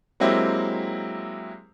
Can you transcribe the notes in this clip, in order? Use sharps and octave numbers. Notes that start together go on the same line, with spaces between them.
F#3 G#3 A#3 C4 E4 G4